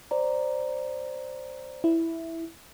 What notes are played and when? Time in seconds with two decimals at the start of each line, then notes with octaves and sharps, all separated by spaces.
0.11 C5 D5 A#5
1.84 E4